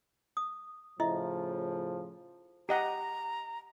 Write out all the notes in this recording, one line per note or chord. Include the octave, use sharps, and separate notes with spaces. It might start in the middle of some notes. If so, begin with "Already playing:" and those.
D#6
A2 C#3 F3 E4 D#5 E5
G4 D#5 F#5 A#5